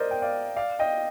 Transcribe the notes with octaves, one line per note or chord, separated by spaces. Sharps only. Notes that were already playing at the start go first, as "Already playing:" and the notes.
Already playing: A#4 C5 D5 D#5
G5
D5 F5
D5 F5
D#5 G5